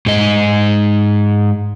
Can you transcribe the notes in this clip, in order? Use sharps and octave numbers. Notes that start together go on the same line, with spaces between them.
G#2 D#5